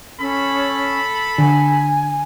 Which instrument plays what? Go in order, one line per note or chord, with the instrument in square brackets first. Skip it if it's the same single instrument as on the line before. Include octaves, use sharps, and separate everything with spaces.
[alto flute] C#4 [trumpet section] A4 B5
[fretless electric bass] D3 [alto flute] G#5